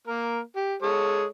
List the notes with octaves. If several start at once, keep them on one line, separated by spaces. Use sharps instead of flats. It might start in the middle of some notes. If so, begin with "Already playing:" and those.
A#3 A#4
G4
G#3 A4 C#5